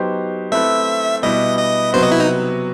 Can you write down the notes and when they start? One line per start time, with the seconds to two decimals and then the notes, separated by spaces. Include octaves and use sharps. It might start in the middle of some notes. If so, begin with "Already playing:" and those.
Already playing: F#3 B3 D#4 G4 C5
0.52 A3 C4 E4 B4 E5
1.23 B2 G3 B3 E4 D#5
1.59 D#5
1.93 C3 F#3 B3 F#4 C5
2.03 D#5
2.11 E4
2.20 D#4